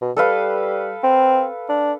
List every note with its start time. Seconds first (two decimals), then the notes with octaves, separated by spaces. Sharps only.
0.01 B2
0.17 G3 A4 B4 F5
1.03 C4
1.69 D4